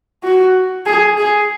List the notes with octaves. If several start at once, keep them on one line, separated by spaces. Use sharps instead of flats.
F#4
G#4
G#4